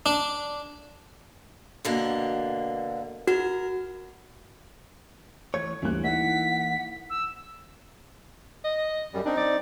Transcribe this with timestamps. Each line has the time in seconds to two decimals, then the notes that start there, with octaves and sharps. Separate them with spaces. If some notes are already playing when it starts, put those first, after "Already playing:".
0.06 D4
1.85 B2 D3 A#3
3.27 F#4 A#4
5.54 E3 A3 C#5 G#6
5.82 D2 E3 G3 A#3 F#6
6.04 D#4 E4 F#5 B6
7.10 E6
8.64 D#5
9.14 F#2 G3
9.26 C4 D4 D#4
9.37 D5